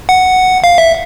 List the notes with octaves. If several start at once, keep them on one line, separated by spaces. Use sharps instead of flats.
F#5
F5
E5